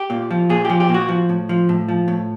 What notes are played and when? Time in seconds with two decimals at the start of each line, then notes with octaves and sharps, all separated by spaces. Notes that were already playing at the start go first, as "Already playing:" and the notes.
Already playing: G4
0.10 A#2
0.31 F3
0.49 A#2 G#4
0.65 F3 G4
0.80 G4
0.89 A#2
0.94 F#4
1.09 F3
1.29 A2
1.49 F3
1.69 A2
1.89 F3
2.08 A2